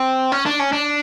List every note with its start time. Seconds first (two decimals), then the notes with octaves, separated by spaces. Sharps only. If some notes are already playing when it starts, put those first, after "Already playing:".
Already playing: C4
0.32 C#4
0.46 D4
0.59 C#4
0.73 D4